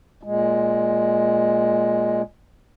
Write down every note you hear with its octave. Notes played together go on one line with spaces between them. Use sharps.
A#2 G#3